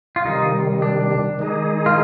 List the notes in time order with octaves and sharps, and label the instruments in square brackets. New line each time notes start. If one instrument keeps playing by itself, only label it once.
[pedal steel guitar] F4
[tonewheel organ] C3 D#3 G3 [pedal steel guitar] D#4
[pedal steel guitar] D4
[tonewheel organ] D#3 G#3 D#4 G#4
[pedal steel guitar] F4